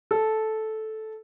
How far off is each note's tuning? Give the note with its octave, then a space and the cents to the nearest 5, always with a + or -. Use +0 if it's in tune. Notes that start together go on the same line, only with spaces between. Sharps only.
A4 -10